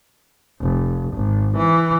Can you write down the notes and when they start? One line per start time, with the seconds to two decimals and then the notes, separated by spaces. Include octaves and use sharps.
0.61 F1
1.15 G#1
1.57 E3